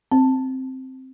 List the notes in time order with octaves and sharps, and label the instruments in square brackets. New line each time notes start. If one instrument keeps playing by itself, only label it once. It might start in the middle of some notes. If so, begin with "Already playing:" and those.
[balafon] C4